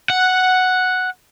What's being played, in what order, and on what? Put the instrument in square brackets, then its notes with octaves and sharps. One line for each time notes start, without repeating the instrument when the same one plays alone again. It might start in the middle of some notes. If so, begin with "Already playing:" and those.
[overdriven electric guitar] F#5